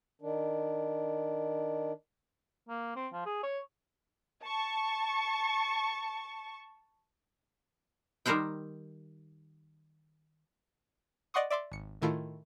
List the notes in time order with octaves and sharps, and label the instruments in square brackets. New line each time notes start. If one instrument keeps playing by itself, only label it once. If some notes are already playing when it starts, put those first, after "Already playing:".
[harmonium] D#3 D4
[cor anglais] A#3
C4
F3
G#4
C#5
[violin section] A5 C#6
[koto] D#3 G3 A#4 C5 F#5 G5
[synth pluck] D5 D#5 F#5 C6 C#6 D#6
D5 E5 C6 D6
G#1 C#7
A2 D#3 A3 E4 F4